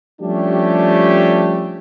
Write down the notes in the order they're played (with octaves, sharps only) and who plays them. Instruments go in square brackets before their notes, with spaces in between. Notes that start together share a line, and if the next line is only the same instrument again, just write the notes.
[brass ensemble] F3 G3 A3 C#4 D4 G4